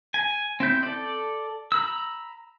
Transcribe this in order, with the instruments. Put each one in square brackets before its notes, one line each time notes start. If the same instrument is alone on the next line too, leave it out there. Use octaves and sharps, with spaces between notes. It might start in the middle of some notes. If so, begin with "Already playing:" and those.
[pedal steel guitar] G#5
C4 E4 G6
A4 D5
A#5 B5 E6